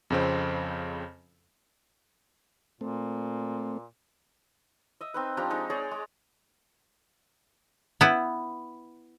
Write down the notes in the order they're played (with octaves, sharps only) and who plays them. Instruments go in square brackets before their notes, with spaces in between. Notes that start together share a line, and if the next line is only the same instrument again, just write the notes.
[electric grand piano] F2 C#3 C4
[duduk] A#2 [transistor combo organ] A3 C4
[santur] D#5 E5
C4 D#4 B4
F3 D4 G4 A#5
G#3 D#4
G#4 C#5 D5 A#5
G#3
[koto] B3 E4